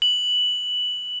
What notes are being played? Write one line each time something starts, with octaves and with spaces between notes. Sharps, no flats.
F#7